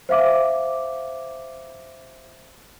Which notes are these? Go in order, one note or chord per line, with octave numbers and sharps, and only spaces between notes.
C5 E5 F5 D6